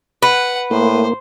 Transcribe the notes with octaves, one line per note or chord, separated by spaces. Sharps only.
B4 F#5
A2 A#3 C5